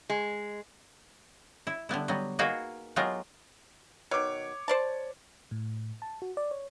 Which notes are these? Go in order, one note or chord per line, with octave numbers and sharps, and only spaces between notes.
G#3
E4
D3 G3 B3 E4
F#3 G3 B3
A#3 D#4 F#4 G#4 A#4 B4
F#3 G#3 B3 F4 G4 A#4
B2 D#3 C#5 D6
C5 D5 A5
A2
A5
F#4
D5
C#5